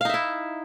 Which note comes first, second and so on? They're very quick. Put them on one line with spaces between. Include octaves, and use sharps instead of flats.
F5 D#4 E5 E4